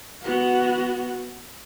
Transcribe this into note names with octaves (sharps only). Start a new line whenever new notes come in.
B3 F#4